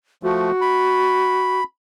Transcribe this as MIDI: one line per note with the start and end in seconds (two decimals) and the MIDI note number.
0.23 0.51 53
0.23 0.51 57
0.23 1.61 66
0.61 1.64 83